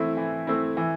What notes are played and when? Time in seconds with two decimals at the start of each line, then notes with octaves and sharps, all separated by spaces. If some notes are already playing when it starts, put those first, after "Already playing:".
Already playing: E3 A3 C4 E4
0.17 E3
0.47 A3 C4 E4
0.77 E3